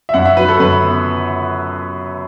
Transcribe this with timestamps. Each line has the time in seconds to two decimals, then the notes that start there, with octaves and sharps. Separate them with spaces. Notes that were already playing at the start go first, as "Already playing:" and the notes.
0.09 E5
0.14 F#2 F#5
0.25 E5
0.37 F#3 B4
0.48 A4
0.59 F#2 B4
0.82 B3